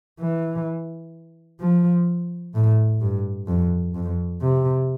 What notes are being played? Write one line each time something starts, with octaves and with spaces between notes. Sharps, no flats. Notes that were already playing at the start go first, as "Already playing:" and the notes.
E3
F3
A2
G2
F2
F2
C3